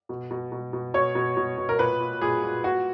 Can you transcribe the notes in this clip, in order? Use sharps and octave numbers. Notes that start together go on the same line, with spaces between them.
B2
B2
B2
B2
B2 C#5
B2
B2
B2
A#4
A#2 B4
A#2
A#2 G#4
A#2
A#2 F#4